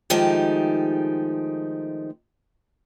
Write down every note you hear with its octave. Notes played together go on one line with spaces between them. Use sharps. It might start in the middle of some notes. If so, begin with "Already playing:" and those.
D#3 F3 G#3 A3 D#4 G4